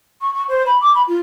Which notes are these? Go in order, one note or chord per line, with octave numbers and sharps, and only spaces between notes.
C#6
C#6
C5
B5
D6
B5
F4